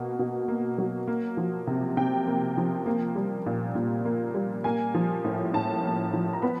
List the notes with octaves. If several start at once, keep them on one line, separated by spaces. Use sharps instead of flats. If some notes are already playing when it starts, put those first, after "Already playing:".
Already playing: B2 A#3
B2
A#3
F#3
A#3
F3
C3
C3 G5
A#3
F3
A#3
G3
A#2
A#2
A#3
G3
A#3 G#5
F3
A2
A2 A5
A#3
F3
A#5
B3 B5